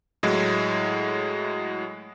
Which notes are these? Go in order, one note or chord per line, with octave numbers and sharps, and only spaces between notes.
A2 F#3 G#3 E4